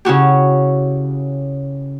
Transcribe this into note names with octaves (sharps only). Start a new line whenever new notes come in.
C#3 E4 F#4 G4